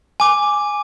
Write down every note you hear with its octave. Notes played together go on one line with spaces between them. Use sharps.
G#5 D6